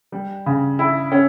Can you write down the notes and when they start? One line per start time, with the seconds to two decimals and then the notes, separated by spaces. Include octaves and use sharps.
0.12 G3
0.46 C#3
0.79 E4
1.12 C#4